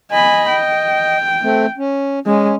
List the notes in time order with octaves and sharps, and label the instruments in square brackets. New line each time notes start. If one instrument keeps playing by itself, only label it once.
[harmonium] D#5 [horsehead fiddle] G#5 B5
[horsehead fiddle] G5
[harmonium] A3 C4
C#4
[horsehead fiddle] G#3 [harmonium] C#4